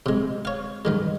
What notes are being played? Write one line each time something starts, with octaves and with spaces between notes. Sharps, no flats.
C3 G#3
C#5 F5
G2 D#3 G#3